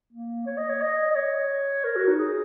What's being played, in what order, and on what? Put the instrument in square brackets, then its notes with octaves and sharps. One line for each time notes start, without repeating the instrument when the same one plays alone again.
[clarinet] A#3
C#5
D#5
C#5
D#5
D#5
C#5
A#4
F#4
D#4
G#4